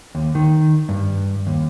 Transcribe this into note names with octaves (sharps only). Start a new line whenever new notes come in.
D#2
D#3
G2
D#2